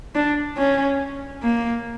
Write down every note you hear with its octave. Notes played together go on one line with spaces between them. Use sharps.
D4
C#4
A#3